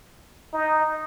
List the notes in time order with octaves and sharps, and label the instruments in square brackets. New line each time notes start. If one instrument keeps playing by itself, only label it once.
[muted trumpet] D#4